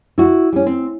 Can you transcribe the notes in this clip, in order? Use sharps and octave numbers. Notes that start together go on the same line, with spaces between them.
E4 F#4
G3 C#4
C4